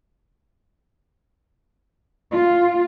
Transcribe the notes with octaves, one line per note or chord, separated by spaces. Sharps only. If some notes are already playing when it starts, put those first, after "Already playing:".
F4